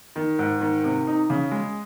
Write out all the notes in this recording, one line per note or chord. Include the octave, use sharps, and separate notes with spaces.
D#3
G#2
D#3
C3
D#4
C#3
G#3